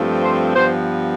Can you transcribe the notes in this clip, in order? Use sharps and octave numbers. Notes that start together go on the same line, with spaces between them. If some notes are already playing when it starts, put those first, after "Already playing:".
Already playing: G2 F3 A3 C4
C5
G2 F3 B3 C5